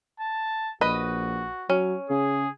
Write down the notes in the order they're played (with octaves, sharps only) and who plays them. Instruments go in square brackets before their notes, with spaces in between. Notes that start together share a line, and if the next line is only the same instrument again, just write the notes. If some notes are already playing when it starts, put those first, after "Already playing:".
[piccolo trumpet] A5
[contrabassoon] A#1 [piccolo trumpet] F#4 [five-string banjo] B4 D#5
[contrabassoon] F#3 [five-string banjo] C#4
[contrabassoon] C#3 [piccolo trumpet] G#4